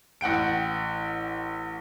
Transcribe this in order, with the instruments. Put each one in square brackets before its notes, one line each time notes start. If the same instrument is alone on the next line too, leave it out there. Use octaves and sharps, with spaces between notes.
[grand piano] A1 F#5 G5 D7